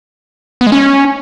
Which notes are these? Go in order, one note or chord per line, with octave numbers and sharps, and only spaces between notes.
B3
G#3
C#4